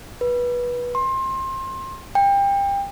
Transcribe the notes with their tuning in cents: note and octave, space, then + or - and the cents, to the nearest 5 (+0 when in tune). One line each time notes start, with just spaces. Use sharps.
B4 -20
C6 +25
G5 +25